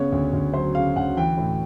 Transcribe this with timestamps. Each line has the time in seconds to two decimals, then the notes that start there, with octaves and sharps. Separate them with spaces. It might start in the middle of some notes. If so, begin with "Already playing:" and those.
Already playing: C#3 B3 C#5
0.12 D2
0.33 D2
0.54 F#3 C5
0.75 C#3 F5
0.96 D2 F#5
1.17 E3 G5
1.37 A2